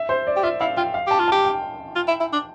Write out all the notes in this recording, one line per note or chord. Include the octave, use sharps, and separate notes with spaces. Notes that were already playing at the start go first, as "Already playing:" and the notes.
Already playing: E5
C5
D5
G4
F4 E5
E4 F5
F4 G5
F5
G4 A5
F4
G4 A5
G5
F4
E4
E4
D4